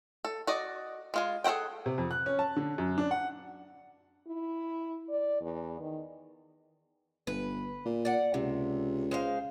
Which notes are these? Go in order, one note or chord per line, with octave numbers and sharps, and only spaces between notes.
A4
F#4 D5 D#5
G#3 F4 G#5
G#4 A4 C5 F#5 G5
C3
F2
F#6
C#4
A5
D3
F#2
D4
F#5
E4
D5
E2
D#3
G1 B4
A#2
D5 F#5
C#2 C3
G#3 C5 F5